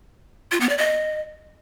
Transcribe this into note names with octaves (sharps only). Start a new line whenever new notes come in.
F4
B3
D5
D#5